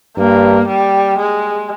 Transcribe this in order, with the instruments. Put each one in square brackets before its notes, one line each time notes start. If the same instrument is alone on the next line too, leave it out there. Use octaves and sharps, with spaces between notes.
[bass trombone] G2 [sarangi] A#3
[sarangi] G3
G#3